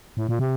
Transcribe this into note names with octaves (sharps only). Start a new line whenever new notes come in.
A2
A#2
C3